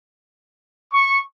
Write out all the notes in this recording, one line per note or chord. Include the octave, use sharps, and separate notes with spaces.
C#6